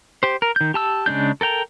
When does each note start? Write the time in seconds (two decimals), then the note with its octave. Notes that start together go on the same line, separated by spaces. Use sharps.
0.23 G4 C5
0.42 A#4
0.56 D#3 G6
0.74 G4 A5 E6
1.06 C#3 G#3 D4 G6
1.41 A4 A#4 G5 A#5